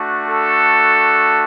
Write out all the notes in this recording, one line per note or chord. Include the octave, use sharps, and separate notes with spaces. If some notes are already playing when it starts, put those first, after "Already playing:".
Already playing: A3 D4 F#4
A4